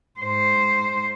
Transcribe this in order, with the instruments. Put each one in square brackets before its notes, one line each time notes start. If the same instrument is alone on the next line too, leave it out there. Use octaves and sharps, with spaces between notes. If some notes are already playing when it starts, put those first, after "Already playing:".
[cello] G#2 C5